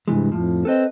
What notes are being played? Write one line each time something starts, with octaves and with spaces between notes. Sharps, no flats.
G2 C3 E3 G#3
F2 A2 F3
C4 A4 B4 D#5